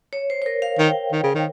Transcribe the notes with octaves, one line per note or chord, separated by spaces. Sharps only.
C#5
C5
C5
A#4
F5
D#3 G5
D#3
C#3
D#3